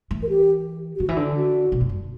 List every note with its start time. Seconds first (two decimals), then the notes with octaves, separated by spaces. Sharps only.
0.11 E3
0.23 A#4
0.29 G4
0.95 G4
1.00 D3 F#4
1.09 E3
1.16 D3 D4
1.36 F#4
1.72 B2
1.81 F#2
1.89 G2